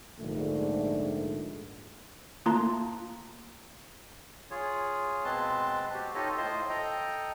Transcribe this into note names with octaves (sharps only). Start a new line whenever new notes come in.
A#1 G#2 D3 A3
A3 A#3 F4 A5 A#5 C6
F4 G#4 C#5
B2 G#3 C4 B4 A5 C6
F#4 G4
D#4 F4 G4 A4 C#5 D#5
A2 F4 C5 D#5 C6
A4 D#5 G5 A#5